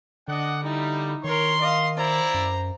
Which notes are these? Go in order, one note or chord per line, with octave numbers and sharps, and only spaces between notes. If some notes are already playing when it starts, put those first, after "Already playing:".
D3 D4 D#5 F#5
G3 D#4 E4
D#3 A#4 C#5 C6
D#5 F5
E4 C5 D5 A#5
F#2